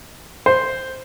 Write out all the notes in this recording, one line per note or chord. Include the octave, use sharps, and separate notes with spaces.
C5